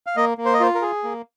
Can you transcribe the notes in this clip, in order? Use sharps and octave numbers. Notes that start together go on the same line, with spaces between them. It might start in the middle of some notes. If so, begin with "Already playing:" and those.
F5
A#3 D#5
A#3
C5
D#5
F4 C5
A#4
G#4
A#3